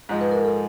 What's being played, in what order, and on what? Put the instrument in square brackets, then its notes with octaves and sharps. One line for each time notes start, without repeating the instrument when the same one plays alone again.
[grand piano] G#2 F3 G#3
[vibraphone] B4
A#4
A4